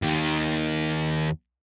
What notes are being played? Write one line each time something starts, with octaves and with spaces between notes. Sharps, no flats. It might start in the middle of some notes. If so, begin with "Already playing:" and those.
D#2 D#3